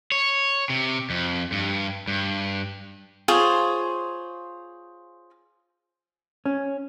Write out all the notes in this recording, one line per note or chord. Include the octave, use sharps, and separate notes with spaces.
C#5
C3
F2
G2
G2
F4 G#4 C5 C#5
C#4